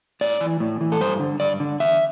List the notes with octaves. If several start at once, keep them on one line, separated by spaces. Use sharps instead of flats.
A2 D5
E3
A2
E3
A4
G2 C5
D3
G2 D5
D3
E2 E5